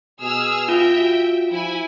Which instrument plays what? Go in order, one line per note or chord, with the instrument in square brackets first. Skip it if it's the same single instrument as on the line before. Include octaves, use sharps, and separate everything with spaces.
[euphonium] B2 [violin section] G#4 E6 F6
[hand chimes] F4 [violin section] E5 G5
[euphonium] F#4
[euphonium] F3 [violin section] E4 G#5